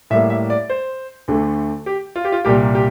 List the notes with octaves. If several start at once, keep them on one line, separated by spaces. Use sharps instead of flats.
A2 G3 A#3 E5
E5
D5
C5
D2 D3 A3
G4
F4
G4
F4
C2 A#2 G3 A#3 G4
G4